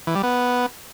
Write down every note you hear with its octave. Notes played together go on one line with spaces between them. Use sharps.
E3
G3
B3